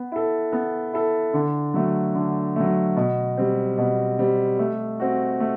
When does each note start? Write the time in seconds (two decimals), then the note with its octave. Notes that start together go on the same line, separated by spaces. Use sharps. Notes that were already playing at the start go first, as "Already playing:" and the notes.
Already playing: B3
0.12 E4 A4
0.52 B3
0.93 E4 A4
1.33 D3
1.74 F#3 A3
2.15 D3
2.56 F#3 A3
2.96 B2
3.37 G3 C4
3.78 B2
4.19 G3 C4
4.59 A3
5.00 C4 F#4
5.40 A3